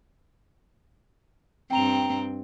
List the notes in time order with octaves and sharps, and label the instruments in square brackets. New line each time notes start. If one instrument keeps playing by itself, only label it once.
[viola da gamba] G2 C4 [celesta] G5 A#5 F7